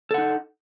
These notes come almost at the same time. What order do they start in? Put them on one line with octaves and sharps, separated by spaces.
A4 F#5 D#4